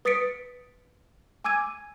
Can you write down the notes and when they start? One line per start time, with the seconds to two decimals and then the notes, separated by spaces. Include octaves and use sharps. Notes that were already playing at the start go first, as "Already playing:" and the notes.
0.05 B4 D#6 A6 B6 C#7 D7
1.44 G#5 D6 E6 G#6 D#7